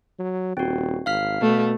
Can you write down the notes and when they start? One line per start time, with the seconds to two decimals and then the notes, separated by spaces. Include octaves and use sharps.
0.19 F#3
0.57 D#1 C4 F#4
1.06 G#1 F5 F6 B6
1.41 B2 A3